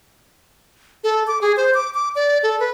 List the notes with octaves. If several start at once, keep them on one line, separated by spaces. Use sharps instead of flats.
A4
D6
G#4
C5
D6
D6
D5
A4
B4